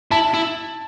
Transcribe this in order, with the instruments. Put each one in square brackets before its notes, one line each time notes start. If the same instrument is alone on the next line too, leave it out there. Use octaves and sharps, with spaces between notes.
[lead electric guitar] E4 [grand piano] A5
[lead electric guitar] E4